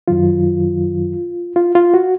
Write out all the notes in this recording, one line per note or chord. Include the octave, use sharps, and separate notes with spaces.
F#2 D#3 F#3 F4
F4
F4
F#4